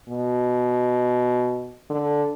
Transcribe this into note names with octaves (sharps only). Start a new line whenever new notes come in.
B2
D3